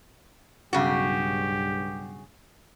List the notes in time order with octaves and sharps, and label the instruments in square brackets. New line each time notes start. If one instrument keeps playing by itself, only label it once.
[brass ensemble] B1 G2 [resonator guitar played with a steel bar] C#3 F#4 [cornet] G4